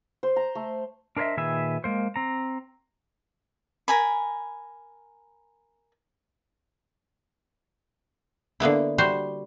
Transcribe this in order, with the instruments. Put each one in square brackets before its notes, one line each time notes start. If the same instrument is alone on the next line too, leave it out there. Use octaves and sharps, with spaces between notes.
[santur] C5
A#5
A3
[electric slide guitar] D4 A#4 C5 C#5 D#5 E5
A#2 D#3 G#4 B4 E5
G#3 A#3 C5
C4 A#5
[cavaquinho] A#4 G#5 B5
[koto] D3 A#3 B3 E4
G3 F#4 C5